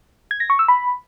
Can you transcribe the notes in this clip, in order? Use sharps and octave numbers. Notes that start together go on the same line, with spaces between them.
G#6
A#6
C#6
E6
B5